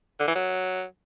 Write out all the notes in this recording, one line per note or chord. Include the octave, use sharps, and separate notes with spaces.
D3
E3
F#3